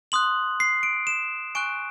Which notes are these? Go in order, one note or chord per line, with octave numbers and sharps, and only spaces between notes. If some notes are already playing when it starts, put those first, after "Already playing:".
C6 D#6 F#6 F#7
C7
D7
E7
G#5 C#6 F#6 D7